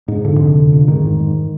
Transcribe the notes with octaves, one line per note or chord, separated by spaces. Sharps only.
G#2
F2 D3
C3
C3
F2
G#2 D#3
G#2
G#2